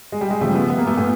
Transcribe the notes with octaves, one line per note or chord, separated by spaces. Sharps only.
G#3
G3
G#3
C#3 F3 G3 A3
A3 B3
B3
A#3
A3 B3
A#2 A3 B3